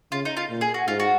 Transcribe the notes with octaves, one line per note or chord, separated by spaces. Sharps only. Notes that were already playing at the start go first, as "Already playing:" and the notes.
C#3 F4
D#4
F4
A#2
G#4
F#4
G#2 F4
F#4